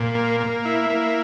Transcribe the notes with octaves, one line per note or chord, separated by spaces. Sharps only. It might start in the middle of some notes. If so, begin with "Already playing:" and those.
Already playing: A#2
A#3
A#3
E4
A#3